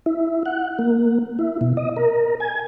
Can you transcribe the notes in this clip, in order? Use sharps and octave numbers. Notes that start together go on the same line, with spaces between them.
E4
F#5
A#3
E4
B2
D#5
A#4
G#5